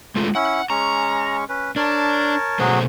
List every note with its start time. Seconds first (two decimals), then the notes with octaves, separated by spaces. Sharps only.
0.16 G#3 A3 F4
0.35 C#4 E4 F#5
0.70 G#3 C#4 A#5 C#6
1.49 C#4 B4
1.76 D4 A#4 C#5 A5
2.60 B2 F#3 A3 F#4 G#4 C5